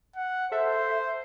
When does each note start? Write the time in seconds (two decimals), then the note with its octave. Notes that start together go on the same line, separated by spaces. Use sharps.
0.16 F#5
0.52 A4 C5 E5